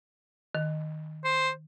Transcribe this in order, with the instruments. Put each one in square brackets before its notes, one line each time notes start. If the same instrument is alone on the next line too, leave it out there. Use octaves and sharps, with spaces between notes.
[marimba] D#3
[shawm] C5